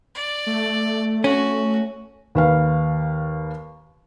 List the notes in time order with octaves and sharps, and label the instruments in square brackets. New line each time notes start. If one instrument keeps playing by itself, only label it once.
[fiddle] D5
[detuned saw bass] A3
[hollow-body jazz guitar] C#4 [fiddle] F#4
[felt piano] D#2 B4 F5